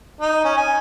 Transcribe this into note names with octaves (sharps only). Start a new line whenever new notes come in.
D#4
C#4
G#5